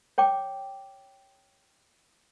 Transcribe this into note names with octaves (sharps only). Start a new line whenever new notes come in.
C#5 G5 D6